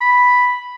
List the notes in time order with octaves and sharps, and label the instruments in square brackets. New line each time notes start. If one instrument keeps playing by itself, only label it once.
[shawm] B5